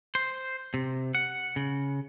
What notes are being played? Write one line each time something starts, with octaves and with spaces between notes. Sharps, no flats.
C5
C3
F#5
C#3